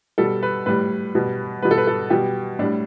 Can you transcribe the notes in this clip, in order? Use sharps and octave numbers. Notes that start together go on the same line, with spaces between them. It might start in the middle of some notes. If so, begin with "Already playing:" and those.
B2 G3 A4
B4
A2 G3 B4
B2 G3
B2 G3 B4
A4
B4
A4
B2 G3 G4
A2 G3 D4